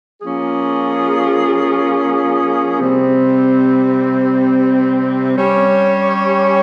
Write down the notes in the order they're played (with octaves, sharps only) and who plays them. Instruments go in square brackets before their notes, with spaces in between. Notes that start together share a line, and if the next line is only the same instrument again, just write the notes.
[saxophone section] F3 A#3 C#4 F4 G#4
C3 G3 C4
G3 C#4 G4 C#5